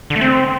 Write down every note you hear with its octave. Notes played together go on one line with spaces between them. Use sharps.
D3
A3
C4